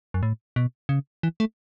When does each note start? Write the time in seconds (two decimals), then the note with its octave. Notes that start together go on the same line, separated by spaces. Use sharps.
0.14 F#2
0.23 A2
0.56 B2
0.89 C#3
1.23 E3
1.40 A3